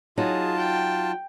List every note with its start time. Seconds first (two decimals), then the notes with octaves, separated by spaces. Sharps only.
0.18 F#3 D#4 F4 G#4 A5
0.57 G5